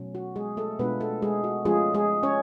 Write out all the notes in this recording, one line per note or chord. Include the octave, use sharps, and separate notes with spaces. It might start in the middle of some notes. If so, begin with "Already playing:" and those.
Already playing: B2 F#3 A3 C#4
F#4
G#3 G#4
A3 A4
B2 G#3 B3 D4 F4 B4
A3 A4
G#3 G#4
F#4
F3 G#3 A3 C#4 F4 G#4
G#3 G#4
C#4 C#5